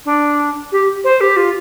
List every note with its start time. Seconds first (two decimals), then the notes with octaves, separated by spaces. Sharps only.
0.05 D4
0.72 G4
1.04 C5
1.20 G4
1.36 F4